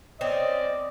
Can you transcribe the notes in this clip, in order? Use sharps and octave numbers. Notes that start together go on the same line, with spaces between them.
C4 C#4 D5 D#5